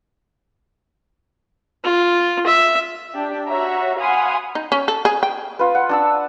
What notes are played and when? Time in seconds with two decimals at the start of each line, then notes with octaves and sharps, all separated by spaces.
1.84 F4
2.47 E5
3.14 D4 G4
3.46 F#4 C#5 E5 A#5
3.99 F5 F#5 G#5 B5 C6 D#6
4.55 D#4
4.72 C#4
4.88 A4
5.05 G#4
5.23 G5
5.59 F4 B4
5.75 F#5
5.89 D4 A5 E6